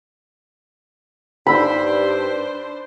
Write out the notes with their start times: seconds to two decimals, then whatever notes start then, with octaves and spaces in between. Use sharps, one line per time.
1.47 G2 D4 D#4 C5 B5 E6 B6